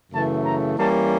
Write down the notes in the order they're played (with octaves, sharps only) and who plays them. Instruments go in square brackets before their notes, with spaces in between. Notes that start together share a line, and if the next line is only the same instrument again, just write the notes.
[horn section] F#2 C#3 E3 A3 A5
A#5
E3 G3 A#3 C#4 A5